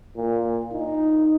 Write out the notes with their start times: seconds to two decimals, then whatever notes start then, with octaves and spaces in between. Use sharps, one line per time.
0.17 A#2
0.73 D#4